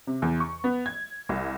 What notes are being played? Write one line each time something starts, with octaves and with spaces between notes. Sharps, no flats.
C3
E2
C#6
B3
G#6
C2